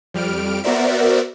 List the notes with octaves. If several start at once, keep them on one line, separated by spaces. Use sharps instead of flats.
F2 G3 F6 D7
B3 F#4 A#4 C5 D5 E5